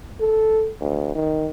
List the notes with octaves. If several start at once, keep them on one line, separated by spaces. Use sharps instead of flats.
A4
D2
D#3